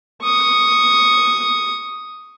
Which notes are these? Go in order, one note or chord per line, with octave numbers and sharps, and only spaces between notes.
C#6 D#6